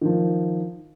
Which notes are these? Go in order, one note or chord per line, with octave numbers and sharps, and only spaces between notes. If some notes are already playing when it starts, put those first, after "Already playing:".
D#3 F3